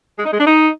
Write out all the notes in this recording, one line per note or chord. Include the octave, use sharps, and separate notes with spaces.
G#3
D#4
G#3
D4
D#4